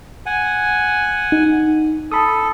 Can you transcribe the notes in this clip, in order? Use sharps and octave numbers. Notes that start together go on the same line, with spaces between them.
F#5 G#5
D#4
A4 A5 B5 D#6